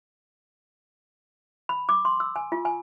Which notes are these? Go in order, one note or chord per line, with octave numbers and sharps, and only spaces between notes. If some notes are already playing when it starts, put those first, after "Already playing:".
B5
D6
C6
E6
G#5
F4
G#5